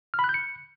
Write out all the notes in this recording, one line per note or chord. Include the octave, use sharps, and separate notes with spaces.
F6
B5
F#6
G6
C#7